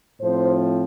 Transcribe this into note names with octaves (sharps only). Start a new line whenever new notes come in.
A2 F3 C4 C5